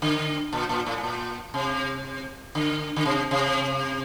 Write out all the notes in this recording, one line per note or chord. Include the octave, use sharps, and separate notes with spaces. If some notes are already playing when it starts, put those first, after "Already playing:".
D3
A#2
A#2
A2
A2
A#2
C3
D3
D3
C3
C3